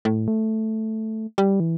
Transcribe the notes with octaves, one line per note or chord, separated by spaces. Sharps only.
A2
A3
G3
E3